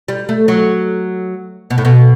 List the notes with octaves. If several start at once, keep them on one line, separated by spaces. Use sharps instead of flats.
G3
A3
F#3
B2
A2
B2